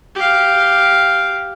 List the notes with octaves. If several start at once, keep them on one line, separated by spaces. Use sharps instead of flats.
G4 F5